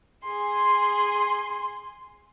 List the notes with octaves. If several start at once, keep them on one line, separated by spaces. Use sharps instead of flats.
G#4 C6